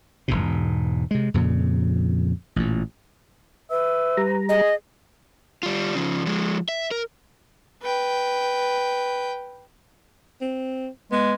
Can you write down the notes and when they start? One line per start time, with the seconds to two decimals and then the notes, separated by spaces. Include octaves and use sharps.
0.28 E1 A#1 G#2 B2
1.11 C3 G#3
1.34 F2 A#2 C#3
2.56 A1 A#2
3.71 B4 E5
4.17 G3 A#5
4.49 G#4 D#5
5.63 G3 F4
5.95 C#3 F3
6.26 F3 G#3
6.69 E5
6.91 A#4
7.82 B4 G5
10.42 C4
11.12 G#3 B3